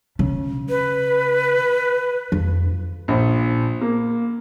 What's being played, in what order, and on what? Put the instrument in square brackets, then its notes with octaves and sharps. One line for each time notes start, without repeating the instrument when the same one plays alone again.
[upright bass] C#3
[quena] B4
[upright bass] F2
[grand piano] A#1
A#3